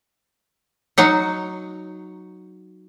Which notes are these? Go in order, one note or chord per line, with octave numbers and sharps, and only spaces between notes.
F#3 D#4 F#4